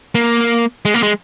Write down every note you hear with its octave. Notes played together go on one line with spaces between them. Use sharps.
A#3
G#3
A#3
G#3